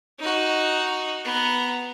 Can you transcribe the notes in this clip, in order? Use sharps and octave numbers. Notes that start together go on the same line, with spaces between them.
D#4 F#4
B3 A#5